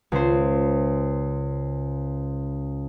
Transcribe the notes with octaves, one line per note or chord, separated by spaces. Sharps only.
C#2 C5